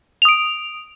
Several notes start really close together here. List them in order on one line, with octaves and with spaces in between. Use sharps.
F7 D#6 D7